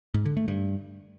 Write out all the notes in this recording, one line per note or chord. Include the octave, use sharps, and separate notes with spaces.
G#2
D3
A3
G2